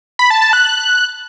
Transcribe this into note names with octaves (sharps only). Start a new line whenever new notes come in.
B5
A5
A5
F#6